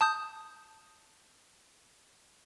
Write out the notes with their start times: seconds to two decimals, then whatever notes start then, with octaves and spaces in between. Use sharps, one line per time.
0.01 A5 D#6 G6